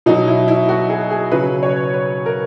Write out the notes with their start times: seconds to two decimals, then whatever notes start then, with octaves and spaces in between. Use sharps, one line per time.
0.06 B2 F#3 D#4
0.28 E4
0.48 E4
0.69 F#4
0.90 G#4
1.11 G#4
1.32 C#3 F#3 B4
1.63 C#5
1.94 B4
2.26 A#4